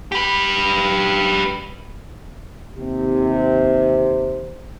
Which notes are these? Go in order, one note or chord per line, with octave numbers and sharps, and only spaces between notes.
G4 B4
D#2 C3